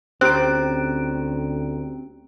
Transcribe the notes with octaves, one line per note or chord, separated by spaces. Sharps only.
D2 C4 C#4 G4 A#5 F#6 D7